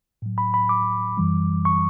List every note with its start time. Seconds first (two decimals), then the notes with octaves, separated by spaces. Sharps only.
0.22 A2 F#3
0.38 B5
0.54 B5
0.69 D6
1.17 F#2 E3 G3
1.65 C#6